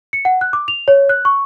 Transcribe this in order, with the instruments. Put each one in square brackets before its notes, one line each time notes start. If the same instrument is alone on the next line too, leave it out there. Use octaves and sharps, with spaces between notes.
[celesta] C#7
F#5
F#6
D6
F7
C#5
F#6
C#6